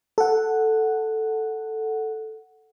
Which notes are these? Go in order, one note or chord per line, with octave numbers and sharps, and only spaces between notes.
A4 F#5